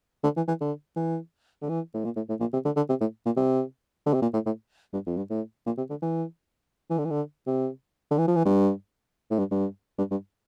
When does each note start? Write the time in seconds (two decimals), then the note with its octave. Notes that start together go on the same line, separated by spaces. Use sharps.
0.24 D3
0.36 E3
0.48 E3
0.61 D3
0.96 E3
1.62 D3
1.69 E3
1.94 A2
2.05 A#2
2.16 A2
2.29 A2
2.40 A#2
2.53 C3
2.65 D3
2.76 D3
2.89 C3
3.01 A2
3.26 A#2
3.36 C3
4.06 D3
4.14 C3
4.22 A#2
4.34 A2
4.46 A2
4.93 G2
5.07 F2
5.17 G2
5.30 A2
5.66 A#2
5.78 C3
5.90 D3
6.02 E3
6.90 E3
6.98 D3
7.05 E3
7.10 D3
7.47 C3
8.11 D3
8.18 E3
8.28 F3
8.36 E3
8.45 G2
9.31 A2
9.39 G2
9.51 G2
9.98 G2
10.11 G2